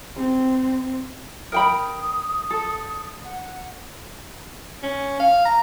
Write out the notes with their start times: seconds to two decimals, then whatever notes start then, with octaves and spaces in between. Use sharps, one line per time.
0.16 C4
1.52 A#4 G5 B5 D#6
2.51 A4
3.25 F#5
4.83 C#4
5.20 F5
5.45 A#5